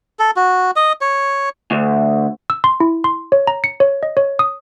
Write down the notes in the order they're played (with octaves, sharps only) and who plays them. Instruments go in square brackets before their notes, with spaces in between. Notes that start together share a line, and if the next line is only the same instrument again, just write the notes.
[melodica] A4
F#4
D#5
C#5
[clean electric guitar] D2
[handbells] E6
C6
E4
C6
C#5
A#5
C#7
C#5
D#5
C#5
D#6